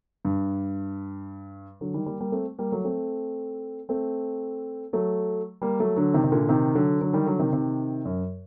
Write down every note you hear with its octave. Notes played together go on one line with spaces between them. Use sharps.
G2
D3 F#3
D#3 G3
G3 A#3
G3 A#3
A3 C4
G3 A#3
F#3 A3
A3 C4
A3 C4
F#3 A3
G3 A#3
F#3 A3
D3 F#3
C3 D#3
C3
A#2 D3
C3 D#3
D3 F#3
D3 F#3
D#3 G3
D3 F#3
C3 D#3
C3 D#3
F#2